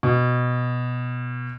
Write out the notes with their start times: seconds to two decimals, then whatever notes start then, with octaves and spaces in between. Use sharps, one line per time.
0.03 B2